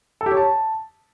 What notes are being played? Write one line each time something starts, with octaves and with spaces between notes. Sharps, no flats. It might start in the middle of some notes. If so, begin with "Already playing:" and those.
A4
G4
C#5
A5